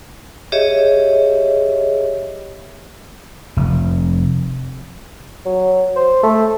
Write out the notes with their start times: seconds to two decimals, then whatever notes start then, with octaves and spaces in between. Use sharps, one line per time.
0.52 G4 G#4 C#5 D#5 E5
3.57 F1
5.46 F#3
5.96 C5
6.23 A3